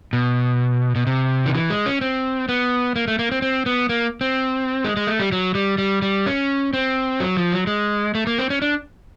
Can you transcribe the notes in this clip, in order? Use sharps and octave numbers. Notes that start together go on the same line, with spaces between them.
B2
B2
C3
D#3
E3
G#3
C#4
C4
B3
A#3
A3
A#3
C4
C4
B3
A#3
C4
G#3
G#3
A3
G3
F#3
G3
G3
G3
C#4
C4
F#3
F3
F#3
G#3
A3
A#3
C4
C#4
D4